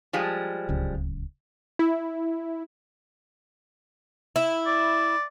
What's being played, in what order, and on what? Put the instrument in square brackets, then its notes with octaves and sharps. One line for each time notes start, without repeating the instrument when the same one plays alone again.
[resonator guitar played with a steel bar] F3 G3 G#3
[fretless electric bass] D1 C#2
[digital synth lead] E4
[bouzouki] E4
[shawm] D5